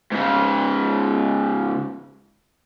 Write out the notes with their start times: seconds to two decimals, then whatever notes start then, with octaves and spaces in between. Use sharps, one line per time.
0.12 G#2 C#3